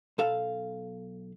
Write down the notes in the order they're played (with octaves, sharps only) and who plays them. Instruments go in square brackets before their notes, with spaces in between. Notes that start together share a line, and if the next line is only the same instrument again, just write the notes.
[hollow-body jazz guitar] B1 A4 F5